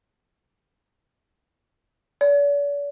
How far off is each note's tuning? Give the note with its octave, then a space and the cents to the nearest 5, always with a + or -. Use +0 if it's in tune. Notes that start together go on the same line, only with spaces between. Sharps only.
D5 -45